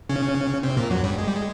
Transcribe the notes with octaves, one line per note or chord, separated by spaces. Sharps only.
C#3 C#4
C3 C4
A#2 A#3
F#2 F#3
G2 G3
G#3
G3
G#3